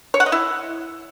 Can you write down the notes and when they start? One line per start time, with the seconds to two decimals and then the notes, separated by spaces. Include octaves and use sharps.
0.14 C#5
0.20 F#5
0.26 D#5
0.32 E4